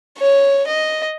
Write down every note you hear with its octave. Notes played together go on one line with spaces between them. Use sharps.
C#5
D#5